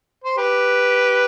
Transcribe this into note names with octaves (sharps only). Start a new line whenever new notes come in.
C5
G4 B4